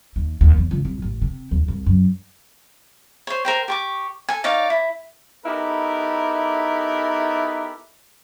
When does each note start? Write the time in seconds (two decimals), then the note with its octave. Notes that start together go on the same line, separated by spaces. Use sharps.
0.16 D#2
0.41 D#2
0.58 E2
0.71 C#2
0.85 C2
1.02 A1
1.22 C3
1.51 D#2
1.68 C2
1.86 F#2
3.27 C5 C#5
3.45 A#4 C5 G5
3.68 G4 C#6 D6
4.29 A4 G#5
4.44 D#4 C#5 D5 F5
4.70 E4
5.45 B3 D#4 E4 G4 A4 A#4